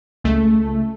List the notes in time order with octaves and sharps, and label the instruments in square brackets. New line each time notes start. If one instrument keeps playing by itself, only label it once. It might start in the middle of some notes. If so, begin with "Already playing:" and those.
[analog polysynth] C#2 A3